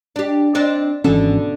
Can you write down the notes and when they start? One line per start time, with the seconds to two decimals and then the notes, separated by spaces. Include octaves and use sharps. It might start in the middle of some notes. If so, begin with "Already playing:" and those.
0.16 D4 G4
0.55 C4 D4 D#4
1.04 G#1 B2 D3 E3 C#4 A4